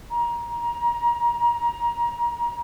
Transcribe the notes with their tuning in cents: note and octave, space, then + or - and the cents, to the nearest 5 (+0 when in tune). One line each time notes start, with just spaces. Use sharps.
A#5 +20